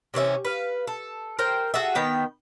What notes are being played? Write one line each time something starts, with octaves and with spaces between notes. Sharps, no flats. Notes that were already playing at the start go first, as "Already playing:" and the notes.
C3 E3 C#4 E5
B4 F5
A4
A#4 C5 G5
F#4 G#4 A4 E5
D#3 B3 G5